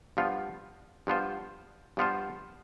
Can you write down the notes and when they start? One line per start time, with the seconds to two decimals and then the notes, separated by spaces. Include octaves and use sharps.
0.17 G2 F3 B3 F4 C5
1.07 G2 F3 B3 F4 C5
1.97 G2 F3 B3 F4 C5